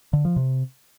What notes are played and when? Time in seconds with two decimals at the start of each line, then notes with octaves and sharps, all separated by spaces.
0.13 D3
0.25 F3
0.36 C3